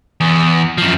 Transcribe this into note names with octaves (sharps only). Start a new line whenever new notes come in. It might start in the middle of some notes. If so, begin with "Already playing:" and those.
E2
F#2 F3